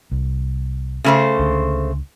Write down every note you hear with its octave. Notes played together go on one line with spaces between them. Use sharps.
C2
C#3 A3 C5
C#2 D3